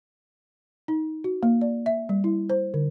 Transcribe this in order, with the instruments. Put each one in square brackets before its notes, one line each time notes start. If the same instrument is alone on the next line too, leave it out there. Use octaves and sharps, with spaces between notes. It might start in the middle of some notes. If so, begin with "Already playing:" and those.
[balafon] D#4
F#4
A#3
D5
E5
G3
E4
C5
D3